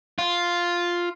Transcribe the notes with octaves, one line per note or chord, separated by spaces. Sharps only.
F4